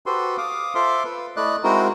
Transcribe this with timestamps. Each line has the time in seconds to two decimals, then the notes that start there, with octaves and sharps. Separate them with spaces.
0.06 F#4 G4 A4 B4 C5 C6
0.38 F5 D6 D#6
0.75 F4 A4 C5 E5 C6 D6
1.05 B4
1.37 A3 E4 D5 D#5 F#6
1.64 G#3 C4 D#4 E4 F#4 A#4